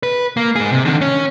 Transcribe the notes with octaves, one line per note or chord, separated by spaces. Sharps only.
B4
A#3
G#2 G#4
C3
D3 D#3
C#4